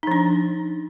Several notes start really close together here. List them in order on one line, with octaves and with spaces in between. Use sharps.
D#4 F3 D4